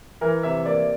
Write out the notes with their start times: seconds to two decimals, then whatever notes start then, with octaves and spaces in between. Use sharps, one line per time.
0.21 E3 A#4
0.43 C3 E5
0.66 A#3 D5